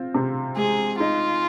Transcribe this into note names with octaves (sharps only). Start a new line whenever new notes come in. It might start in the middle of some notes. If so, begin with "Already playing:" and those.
Already playing: C4 F4
C3
G#3 G#4
D#4 F4